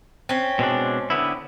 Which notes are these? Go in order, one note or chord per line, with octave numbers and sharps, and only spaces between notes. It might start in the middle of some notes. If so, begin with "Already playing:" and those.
C4 C#4
B2 G#3 D4
D3 B3 E4